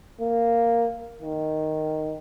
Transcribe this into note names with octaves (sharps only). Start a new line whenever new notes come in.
A#3
D#3